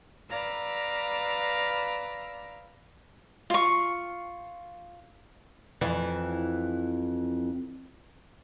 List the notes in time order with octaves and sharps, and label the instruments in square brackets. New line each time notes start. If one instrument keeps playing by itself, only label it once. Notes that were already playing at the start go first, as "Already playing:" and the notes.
[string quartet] B4 D5 F5 A#5 E6
[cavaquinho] F4 C#6
[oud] F2 E3